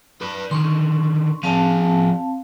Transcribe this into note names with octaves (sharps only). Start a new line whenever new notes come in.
B4 D5
D3 D#3 C6 C#6
F3 C4 G#4 F5 A5